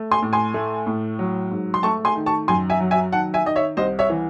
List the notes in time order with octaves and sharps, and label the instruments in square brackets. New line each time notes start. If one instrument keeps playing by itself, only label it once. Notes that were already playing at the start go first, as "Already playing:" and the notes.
Already playing: [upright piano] A3
G#5 C6
A2
G#5 C6
A3
A2
F#3
G#2
C6
A3 A5 C#6
G#5 C6
D#3
A5 C#6
F#2 G#5 C6
E5 G#5
F#3
E5 G#5
D#3 F#5 A5
E5 G#5
D#3 D#5
C#5 E5
C2 C5 D#5
C#5 E5
E3